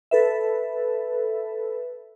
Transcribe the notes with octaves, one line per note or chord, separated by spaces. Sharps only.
A4 B4 E5